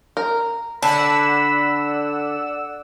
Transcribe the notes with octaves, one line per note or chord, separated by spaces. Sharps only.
A#4
D3 D5 F#5 A5 B5 E6